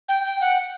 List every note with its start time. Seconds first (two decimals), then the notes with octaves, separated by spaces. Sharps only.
0.08 G5
0.25 G5
0.41 F#5